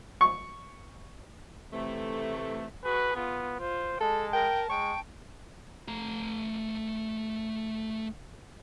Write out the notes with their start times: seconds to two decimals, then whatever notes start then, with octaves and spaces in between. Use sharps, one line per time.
0.21 C#6
1.73 C3 E3 A3
2.84 F#4 G#4 B4
3.16 B3 F4
3.60 F4 C5
4.01 G#3 A4 A5
4.33 A#4 G5
4.70 G#3 G5 C#6
5.88 A3 A#5